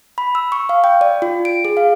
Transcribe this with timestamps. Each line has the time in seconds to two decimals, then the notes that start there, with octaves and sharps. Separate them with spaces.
0.18 B5
0.35 E6
0.52 C#6
0.69 F5
0.84 G5
1.01 D5
1.22 F4
1.45 D7
1.65 G#4
1.77 F5